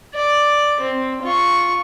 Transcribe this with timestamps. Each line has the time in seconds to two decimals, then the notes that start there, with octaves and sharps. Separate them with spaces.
0.15 D5
0.80 C4
1.23 F4 C#6